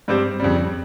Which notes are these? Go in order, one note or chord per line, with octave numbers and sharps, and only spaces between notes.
G2 G3 C4 G4 C5
F2 C#3 G3